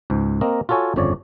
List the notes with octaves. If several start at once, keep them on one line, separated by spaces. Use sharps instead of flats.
C#2 G#2
A#3 C4 A#4 D#5
F4 F#4 A4 C#5 G#5
G1 F2 C#3 F3 C#5 D5